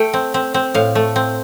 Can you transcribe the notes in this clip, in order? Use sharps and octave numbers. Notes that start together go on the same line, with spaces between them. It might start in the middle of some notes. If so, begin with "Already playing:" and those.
Already playing: A3 G5
C4
C4
C4
A2 F5
A3
C4